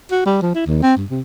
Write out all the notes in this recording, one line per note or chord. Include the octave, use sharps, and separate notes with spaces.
F#4
G3
F3
E4
D#2
C4
G2
C3